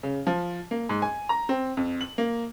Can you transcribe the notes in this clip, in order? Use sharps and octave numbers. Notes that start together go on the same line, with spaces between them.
C#3
F3
A#3
G#2
G#5
A#5
C4
F2
F#7
A#3